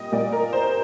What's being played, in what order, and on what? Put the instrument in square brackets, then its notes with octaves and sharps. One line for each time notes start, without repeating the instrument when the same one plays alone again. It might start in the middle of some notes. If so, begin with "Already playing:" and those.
Already playing: [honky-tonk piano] A#2 G3 D#5 G5
A#2 G3 A#3 D5
A#4
C5
C5